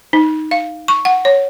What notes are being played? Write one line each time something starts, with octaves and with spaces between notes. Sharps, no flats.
D#4
F5
C#6
F#5
C#5